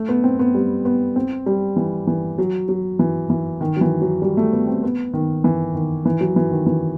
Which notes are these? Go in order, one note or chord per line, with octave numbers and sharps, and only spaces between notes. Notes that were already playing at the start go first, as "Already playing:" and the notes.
Already playing: A3
B3
C4
B3
G3
B3
C4
G3
E3
E3
F#3
F#3
E3
E3
D#3
F#3
E3
F#3
G3
A3
B3
C4
B3
D#3
E3
D#3
E3
F#3
E3
D#3
E3